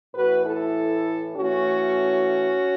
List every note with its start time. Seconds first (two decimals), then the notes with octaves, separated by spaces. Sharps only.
0.15 A2 E3 A3 F#4 B4
0.45 E4 A4
1.37 A2 E3 A3 C#4 F#4